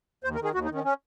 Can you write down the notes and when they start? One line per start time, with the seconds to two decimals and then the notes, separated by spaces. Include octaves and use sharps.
0.24 D#2 C5
0.35 A#4
0.39 D#3 G#4
0.54 D#2 F#4
0.65 D#4
0.70 D#3 C#4
0.85 C#4